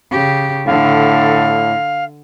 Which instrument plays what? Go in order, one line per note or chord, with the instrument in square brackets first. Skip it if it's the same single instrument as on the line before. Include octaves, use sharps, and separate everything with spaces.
[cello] C#3 G4
[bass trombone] A2 [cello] D3 [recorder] F5